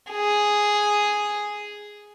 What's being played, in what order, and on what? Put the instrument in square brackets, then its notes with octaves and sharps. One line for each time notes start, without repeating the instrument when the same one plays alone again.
[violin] G#4